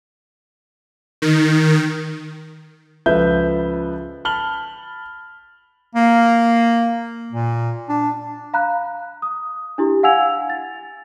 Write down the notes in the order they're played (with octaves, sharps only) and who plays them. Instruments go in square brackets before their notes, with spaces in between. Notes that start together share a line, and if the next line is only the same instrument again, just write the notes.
[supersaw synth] D#3
[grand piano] C#2 F3 A4 B4 E5 G6
A5 B5 F6 F#7 G7
[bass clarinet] A#3
A#2
D4
[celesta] F5 A#5 B5 F#6
D#6
D4 E4 G4
F5 F#5 G#5 E6 G#6 F7
A6